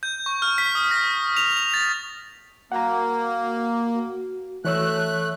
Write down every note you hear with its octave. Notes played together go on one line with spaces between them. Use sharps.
G6
C#6
F6
B6
D#6
A#6
F7
F7
A6
A#3 F#4 F#5 A#5
E3 A3 C#5 E6 F#6